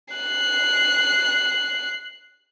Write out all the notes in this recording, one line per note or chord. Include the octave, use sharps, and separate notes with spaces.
F#6 C7